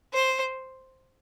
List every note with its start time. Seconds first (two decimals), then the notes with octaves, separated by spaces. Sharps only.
0.13 C5